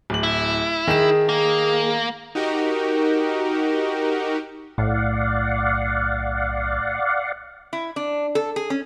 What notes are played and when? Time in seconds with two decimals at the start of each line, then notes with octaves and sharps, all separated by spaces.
0.10 D1 F#7
0.23 E4
0.87 D#3 G#4 E7
1.29 A#3
2.35 D#4 F#4 G4 A#4
4.78 B1 A2 D5 F5 F#5
7.73 E4
7.96 D4
8.35 A4
8.56 G#4
8.70 C#4